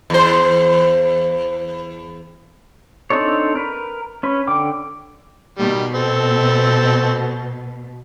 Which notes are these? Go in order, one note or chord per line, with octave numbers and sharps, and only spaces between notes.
E2 C5
C4 D4 D#4 A4 C#5
A#4 B4
C#4 B4
D3 G5 D6
B2 D#3 G3
C4 A4